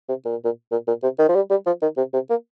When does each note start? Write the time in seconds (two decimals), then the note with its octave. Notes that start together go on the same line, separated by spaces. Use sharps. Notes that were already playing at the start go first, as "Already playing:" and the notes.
0.09 C3
0.25 A#2
0.45 A#2
0.72 A#2
0.88 A#2
1.03 C3
1.19 D#3
1.29 F3
1.35 G3
1.50 G3
1.67 F3
1.82 D#3
1.97 C3
2.14 C3
2.30 A#3